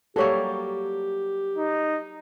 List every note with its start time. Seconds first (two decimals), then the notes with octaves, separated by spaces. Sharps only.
0.16 F#3 G3 A#3 G4 A4 C#5
1.58 D#4